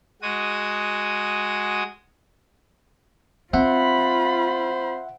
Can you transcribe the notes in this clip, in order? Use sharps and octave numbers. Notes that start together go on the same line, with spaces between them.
G#3 F#4 D#6
C4 F4 C5 E5 F#5 B5